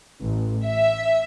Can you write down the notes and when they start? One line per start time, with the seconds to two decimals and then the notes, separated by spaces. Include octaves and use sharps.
0.22 A1
0.65 E5